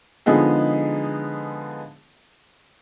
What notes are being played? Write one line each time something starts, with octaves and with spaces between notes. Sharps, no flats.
D3 F3 G#3 B3 D#4 G#4